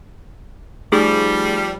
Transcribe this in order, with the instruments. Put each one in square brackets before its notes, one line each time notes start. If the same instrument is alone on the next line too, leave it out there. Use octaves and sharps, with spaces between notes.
[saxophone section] F3 G3 [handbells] A3 D#4 G#4